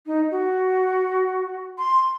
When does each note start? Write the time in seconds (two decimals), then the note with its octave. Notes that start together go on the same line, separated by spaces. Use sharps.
0.06 D#4
0.31 F#4
1.78 C6